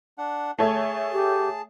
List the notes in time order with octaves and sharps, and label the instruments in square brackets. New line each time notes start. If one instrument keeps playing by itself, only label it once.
[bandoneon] D4 F#5
[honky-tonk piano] A3 C#5 E5 [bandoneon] G#4 A5
[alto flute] G4